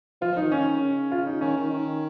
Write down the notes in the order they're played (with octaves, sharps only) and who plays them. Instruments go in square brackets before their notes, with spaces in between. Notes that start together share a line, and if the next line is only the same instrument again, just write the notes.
[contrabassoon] F3 [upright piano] F4
[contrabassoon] F3 [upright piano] D#4
[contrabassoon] D#3
[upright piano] C#4
[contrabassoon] C#3
[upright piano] F4
D#4
[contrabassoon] D#3 [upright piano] C#4
[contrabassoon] D#3
D#3